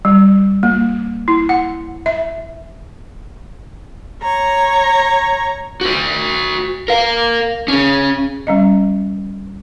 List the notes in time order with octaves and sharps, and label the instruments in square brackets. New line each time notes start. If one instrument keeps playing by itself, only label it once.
[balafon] G3
A#3
E4
F#5
E5
[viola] C#5 A#5
[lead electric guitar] F#4 C5
A#4 F5
C#4 G#4
[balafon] G3 C#4 D#5